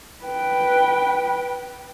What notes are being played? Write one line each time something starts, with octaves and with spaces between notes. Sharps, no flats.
B4 G5